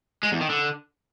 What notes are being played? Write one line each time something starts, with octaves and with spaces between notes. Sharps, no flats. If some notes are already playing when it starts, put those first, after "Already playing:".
G#3
E2
D#3
D3